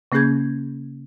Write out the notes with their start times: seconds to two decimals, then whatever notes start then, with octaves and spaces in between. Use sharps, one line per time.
0.12 C#3 A#3 C#4 G#4 G6 G#6